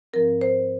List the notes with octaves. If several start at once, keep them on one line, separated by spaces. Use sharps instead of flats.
G#2 F3 C4 A#4
C5